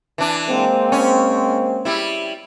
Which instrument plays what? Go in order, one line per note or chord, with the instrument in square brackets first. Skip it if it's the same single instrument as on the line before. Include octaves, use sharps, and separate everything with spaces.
[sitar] E3 D4
[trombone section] G#3 A#3 C4
[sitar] C#4
G3 E4